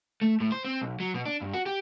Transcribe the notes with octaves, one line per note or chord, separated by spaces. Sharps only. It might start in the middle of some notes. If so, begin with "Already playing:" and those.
A3
A2
C5
C4
B1
F#3
B2
D4
G2
F#4
G4